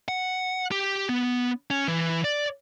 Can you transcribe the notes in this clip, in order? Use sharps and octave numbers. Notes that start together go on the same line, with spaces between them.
F#5
G4
B3
C#4
E3
D5